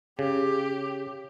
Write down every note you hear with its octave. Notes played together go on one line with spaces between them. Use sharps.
C#3 G4